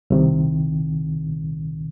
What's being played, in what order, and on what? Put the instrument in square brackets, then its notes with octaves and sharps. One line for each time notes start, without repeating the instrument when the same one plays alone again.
[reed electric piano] C2 C3 D#3